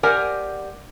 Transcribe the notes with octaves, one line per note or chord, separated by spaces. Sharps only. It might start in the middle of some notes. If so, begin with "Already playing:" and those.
G4 A#4 C5 D5 F#5 G#5